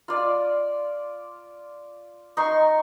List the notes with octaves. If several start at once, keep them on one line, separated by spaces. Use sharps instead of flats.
F4 D5
D#4 C6 C#6